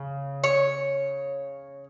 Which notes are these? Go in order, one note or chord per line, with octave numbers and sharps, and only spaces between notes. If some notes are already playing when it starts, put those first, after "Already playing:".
Already playing: C#3
C#5